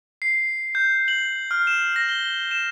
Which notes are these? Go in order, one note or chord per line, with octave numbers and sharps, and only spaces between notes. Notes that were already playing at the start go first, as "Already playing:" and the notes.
C7
G6
F#7
F6
E7
A#6
G7
E7